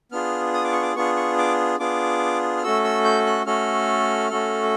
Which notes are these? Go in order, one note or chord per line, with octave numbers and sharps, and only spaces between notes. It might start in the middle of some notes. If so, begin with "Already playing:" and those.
B3 D4 F4 G#4 F6
D#6
D6
C#6
D6
B3 D4 F4 G#4 C#6
C#6
D6
B3 D4 F4 G#4 D6
F6
A3 C#4 F#4 A4 E6
E6
G6
F#6
A3 C#4 F#4 A4 F6
A3 C#4 F#4 A4